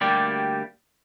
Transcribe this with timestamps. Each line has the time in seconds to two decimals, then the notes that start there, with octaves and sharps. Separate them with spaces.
0.01 D2 G3 A#3 G4 D5